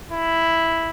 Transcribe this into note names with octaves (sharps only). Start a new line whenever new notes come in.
E4